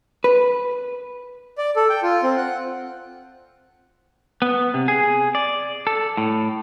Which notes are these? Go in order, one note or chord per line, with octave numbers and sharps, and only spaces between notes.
B4
D5
A4
G5
F4
C4
F#5
B3
C3
G#4
D5
A4
A2